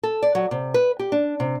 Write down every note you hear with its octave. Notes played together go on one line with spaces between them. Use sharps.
A4
D5
F#3
C3
B4
G4
D4
C3